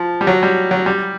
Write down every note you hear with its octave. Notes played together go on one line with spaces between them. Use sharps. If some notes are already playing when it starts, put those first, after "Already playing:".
Already playing: F3
G3
F#3
G3
F#3
G3